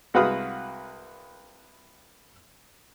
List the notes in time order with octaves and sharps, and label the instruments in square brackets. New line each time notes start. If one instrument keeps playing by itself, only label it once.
[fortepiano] C2 G#3 F#4 B4 F5 D#6